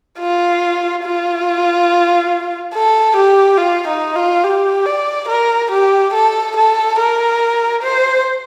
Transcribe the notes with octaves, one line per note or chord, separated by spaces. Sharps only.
F4
F4
A4
G4
F4
D#4
F4
G4
D5
A#4
G4
A4
A4
A#4
C5